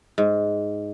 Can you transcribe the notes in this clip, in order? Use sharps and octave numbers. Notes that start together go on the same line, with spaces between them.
G#2